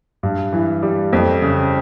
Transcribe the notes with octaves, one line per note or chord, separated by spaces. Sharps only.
G2
E3
G3
F2
C#3